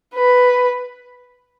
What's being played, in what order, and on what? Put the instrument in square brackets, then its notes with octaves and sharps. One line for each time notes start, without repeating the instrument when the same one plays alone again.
[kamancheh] B4